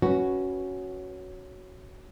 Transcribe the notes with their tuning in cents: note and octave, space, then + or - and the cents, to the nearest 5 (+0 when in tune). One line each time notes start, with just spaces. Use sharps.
C#4 +0 F#4 +5 B4 -5